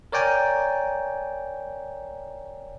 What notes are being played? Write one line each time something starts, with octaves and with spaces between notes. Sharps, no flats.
A#4 C#5 D5 G5 G#5 A#5